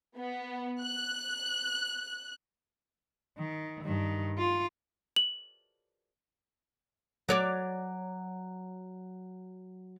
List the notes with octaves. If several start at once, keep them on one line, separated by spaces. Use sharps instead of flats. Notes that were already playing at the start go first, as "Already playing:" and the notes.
B3
F#6
D#3
G2 D#3
F4
F#7
F#3 C#5 D5